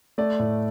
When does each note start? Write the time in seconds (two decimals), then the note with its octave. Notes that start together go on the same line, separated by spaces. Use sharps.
0.18 A3 D5
0.39 A2